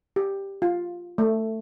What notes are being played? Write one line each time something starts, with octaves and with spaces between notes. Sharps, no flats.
G4
F4
A3